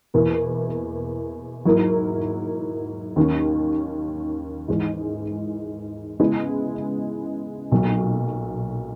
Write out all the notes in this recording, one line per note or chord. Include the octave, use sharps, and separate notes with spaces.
E2 B2 A#3 E4 A#4
G#2 F#3 A#3 E4 A#4
D#2 D#3 A#3 C#4
G#2 E3 G#3
C#3 G#3 B3 E4
B1 A#2 F#3